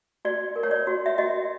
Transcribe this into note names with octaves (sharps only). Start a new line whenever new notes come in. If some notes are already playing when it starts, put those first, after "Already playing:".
F#4 D5
A#4
C#5
D5
F#4
E5
F#4 D#5